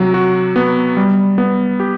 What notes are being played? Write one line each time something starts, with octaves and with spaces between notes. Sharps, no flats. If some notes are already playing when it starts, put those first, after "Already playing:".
Already playing: C3 F#3
F#4
B3
G3
B3
G4